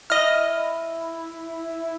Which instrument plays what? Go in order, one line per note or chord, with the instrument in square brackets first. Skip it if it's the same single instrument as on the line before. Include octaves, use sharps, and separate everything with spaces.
[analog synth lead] E4 [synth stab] D#5 F6